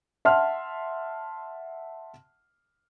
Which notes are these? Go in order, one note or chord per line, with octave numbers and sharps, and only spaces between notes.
E5 F#5 A5 C6 F6